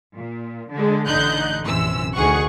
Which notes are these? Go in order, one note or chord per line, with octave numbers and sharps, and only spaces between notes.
A#2
D3 G#3
A1 D3 D#4 F#6 G6
A#1 F#2 C3 E3 C#4 E6
D2 D#3 G#4 F#5 C#6